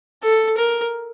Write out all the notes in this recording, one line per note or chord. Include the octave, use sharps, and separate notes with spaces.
A4
A#4